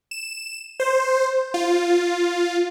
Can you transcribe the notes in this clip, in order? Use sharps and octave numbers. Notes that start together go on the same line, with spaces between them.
E7
C5
F4